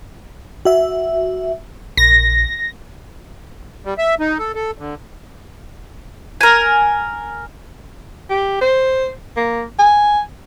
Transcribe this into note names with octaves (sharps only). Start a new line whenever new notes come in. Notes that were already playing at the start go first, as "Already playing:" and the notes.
F#4 E5
A#1 A#6
G3
E5
D#4
A4
A4
D3
A#4 G#5
G4
C5
A#3
G#5